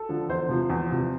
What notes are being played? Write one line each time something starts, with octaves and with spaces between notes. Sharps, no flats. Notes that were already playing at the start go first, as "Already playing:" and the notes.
Already playing: A4
D3 F3
E2 C5
C3 F3
E2
C3 F3